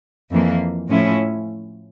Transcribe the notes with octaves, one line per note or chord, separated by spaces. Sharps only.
F2 E3 A#3
A2 F3 C#4 E4